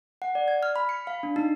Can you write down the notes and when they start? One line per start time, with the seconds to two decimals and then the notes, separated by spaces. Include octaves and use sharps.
0.22 F#5
0.35 D5
0.48 G#6
0.63 F6
0.76 B5
0.89 C#7
1.07 F5
1.23 D4
1.36 D#4